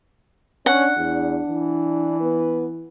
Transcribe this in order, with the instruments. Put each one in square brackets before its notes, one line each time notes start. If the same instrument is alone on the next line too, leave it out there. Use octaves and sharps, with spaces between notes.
[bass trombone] C#4 [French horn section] D4 [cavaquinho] F#5
[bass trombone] E2 [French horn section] D4
[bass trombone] E3
[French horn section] B3 B4